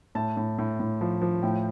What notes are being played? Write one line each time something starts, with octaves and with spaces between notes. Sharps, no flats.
A2 A5
A2
A2
A2
F3
F3
A2 G5